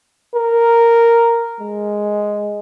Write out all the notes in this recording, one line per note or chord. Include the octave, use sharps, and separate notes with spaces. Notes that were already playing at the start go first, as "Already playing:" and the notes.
A#4
G#3